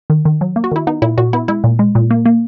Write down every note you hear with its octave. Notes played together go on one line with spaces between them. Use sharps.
D#3
D#3
F#3
A#3
F#4
D#3 E4
B3 D#4
A#2 E4
A#2 F#4
B3 E4
G#3 E4
A#2
G#3
A#2
A#3
A#3